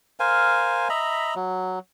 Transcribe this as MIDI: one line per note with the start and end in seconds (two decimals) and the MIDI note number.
0.20 0.88 70
0.20 0.88 72
0.20 0.88 77
0.20 0.88 80
0.89 1.34 75
0.89 1.34 76
0.89 1.34 82
0.89 1.34 83
1.35 1.79 54